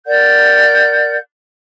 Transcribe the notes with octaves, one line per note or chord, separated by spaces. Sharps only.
A#4 D5 F#5 G6